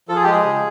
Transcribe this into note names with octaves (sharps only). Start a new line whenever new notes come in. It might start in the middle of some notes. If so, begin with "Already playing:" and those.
F3 A4
G#4
G4
G#3
G#4
C#3